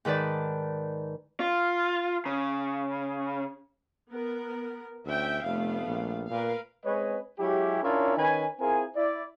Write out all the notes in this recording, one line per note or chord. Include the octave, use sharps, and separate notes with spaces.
G#2 D#3 B4 D5 A5
F4
C#3
B3 A#4
D2 C#4 E5 G5
F1 A3 B3 F5
A#1
A#2 A#4 B4 F5
G#3 C4 C#4 B4 C#5 D#5
F#3 G#3 C#4 E4 G4
C#4 D4 E4 F4 A#4 C#5
D#3 C#4 B4 G#5
C4 E4 F4 G#4 A#4 G#5
E4 D5